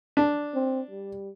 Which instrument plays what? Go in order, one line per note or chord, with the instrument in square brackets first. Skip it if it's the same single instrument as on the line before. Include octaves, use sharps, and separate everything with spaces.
[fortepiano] D4
[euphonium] C4
G3